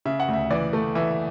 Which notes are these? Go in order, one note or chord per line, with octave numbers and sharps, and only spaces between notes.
C#3 E5
F#5
D2
E5
E3 D5
A3
E3 E5